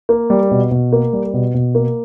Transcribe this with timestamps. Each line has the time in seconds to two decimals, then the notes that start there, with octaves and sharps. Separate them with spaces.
0.09 A#3
0.30 G3
0.51 B2
0.71 B2
0.93 A#3
1.13 G3
1.33 B2
1.54 B2
1.75 A#3